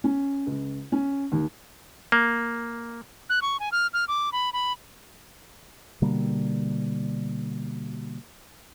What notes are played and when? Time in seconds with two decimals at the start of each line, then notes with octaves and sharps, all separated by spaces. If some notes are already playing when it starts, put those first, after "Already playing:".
0.04 C#4
0.46 C#2
0.92 C#4
1.32 D#2
2.12 A#3
3.30 F#6
3.42 C#6
3.60 G#5
3.72 F6
3.94 F6
4.08 D6
4.33 B5
4.53 B5
6.02 B2 D3 G3 A#3